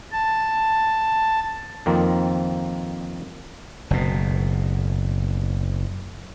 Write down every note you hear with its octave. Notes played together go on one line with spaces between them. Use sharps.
A5
F2 D#3 F3 A#3 C4
F#1 B2